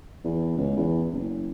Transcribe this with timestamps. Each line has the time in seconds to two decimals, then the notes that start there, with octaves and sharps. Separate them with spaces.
0.24 E2
0.57 C#2
0.77 E2
1.12 F#1